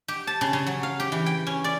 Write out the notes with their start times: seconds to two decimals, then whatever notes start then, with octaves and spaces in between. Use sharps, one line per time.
0.08 G4
0.27 A5
0.41 C#3
0.53 C#3
0.67 F#3
0.83 F5
1.00 G4
1.12 E3
1.26 G5
1.47 C#4
1.64 D5